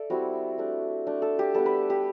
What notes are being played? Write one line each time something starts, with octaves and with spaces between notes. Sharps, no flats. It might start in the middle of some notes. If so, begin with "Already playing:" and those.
Already playing: A4 D5 E5
G3 C4 E4 F#4
A3 D4
A3 D4
A4
G4
G3 B3 D4 A4
B4
G4